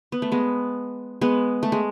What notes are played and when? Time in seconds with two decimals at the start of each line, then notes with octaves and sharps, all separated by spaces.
0.12 B3
0.22 A3
0.32 G#3 B3
1.21 G#3 B3
1.63 A3
1.72 G#3